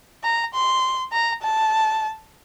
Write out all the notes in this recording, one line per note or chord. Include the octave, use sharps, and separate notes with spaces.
A#5
C6
A#5
A5